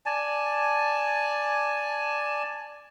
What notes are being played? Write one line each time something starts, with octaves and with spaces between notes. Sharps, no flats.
D5 G#5 A5